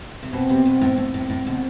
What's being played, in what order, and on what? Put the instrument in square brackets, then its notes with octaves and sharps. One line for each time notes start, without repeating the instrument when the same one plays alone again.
[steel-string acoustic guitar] C3
[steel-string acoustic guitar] B2 [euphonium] C4
[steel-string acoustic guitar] C3
B2
A2
[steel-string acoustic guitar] A2 [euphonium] C4
[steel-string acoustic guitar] A2
A2
B2 D3